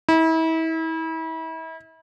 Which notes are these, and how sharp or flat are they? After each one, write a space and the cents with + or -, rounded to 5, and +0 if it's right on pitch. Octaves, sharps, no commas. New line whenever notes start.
E4 -35